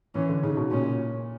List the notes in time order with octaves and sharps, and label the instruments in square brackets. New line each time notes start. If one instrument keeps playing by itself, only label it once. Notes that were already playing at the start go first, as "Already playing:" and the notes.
[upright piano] E3 [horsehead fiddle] C#4
[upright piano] D3
[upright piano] C#3 [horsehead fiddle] D#4
[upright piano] B2
[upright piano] A#2 [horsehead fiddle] C#4